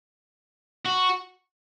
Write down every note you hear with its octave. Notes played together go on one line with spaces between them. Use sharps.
F#4